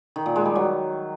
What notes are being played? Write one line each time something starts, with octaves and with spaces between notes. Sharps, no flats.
D#3
A#2
G#3
G3
F#3